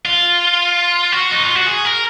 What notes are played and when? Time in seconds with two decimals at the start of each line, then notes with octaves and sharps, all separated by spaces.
0.05 F4
1.13 F#4
1.32 D#4
1.43 F4
1.55 F#4
1.66 G#4
1.85 A#4